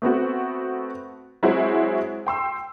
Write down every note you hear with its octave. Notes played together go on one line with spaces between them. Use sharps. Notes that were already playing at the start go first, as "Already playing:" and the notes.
A3 B3 C4 F#4
F#3 G#3 C4 E4 F#4 C5
G5 C6 E6